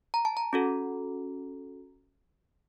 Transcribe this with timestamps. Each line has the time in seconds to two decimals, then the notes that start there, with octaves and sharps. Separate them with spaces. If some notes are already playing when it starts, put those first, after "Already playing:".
0.14 A#5
0.25 A5
0.37 A#5
0.53 C#4 F#4 A4